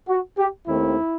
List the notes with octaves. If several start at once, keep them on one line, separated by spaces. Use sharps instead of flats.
F#4
G4
D#2 D#3 A3 C4 E4